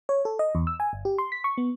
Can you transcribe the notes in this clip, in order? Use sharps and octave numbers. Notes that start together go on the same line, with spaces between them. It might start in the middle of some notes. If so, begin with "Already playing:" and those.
C#5
A4
D#5
E2
E6
G#5
G1
G4
C6
B6
C#6
B3